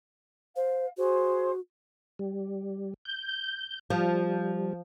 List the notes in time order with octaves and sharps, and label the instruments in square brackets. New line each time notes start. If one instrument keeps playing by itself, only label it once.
[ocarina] C5 [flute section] F5
[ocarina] F#4 [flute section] G#4 C5
[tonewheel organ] G3
G6
[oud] F3 [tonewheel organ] G3